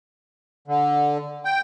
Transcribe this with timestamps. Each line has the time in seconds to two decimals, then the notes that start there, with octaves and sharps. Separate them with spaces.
0.68 D3
1.45 G5